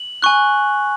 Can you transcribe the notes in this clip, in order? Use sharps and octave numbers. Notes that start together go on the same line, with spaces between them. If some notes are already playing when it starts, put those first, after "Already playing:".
Already playing: F#7
G#5 C#6 F#6